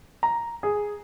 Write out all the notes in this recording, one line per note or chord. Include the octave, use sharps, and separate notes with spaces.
A#5
G#4